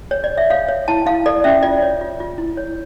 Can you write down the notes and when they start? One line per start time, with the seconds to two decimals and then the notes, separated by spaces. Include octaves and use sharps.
0.11 C#5
0.24 D5
0.38 E5
0.50 C#5 F5
0.68 C#5
0.88 E4 A5
1.06 E4 F5
1.26 A4 D5
1.44 C#4 E5
1.63 F4 D5
1.82 C#5
2.01 F4
2.20 F4
2.38 E4
2.57 C#5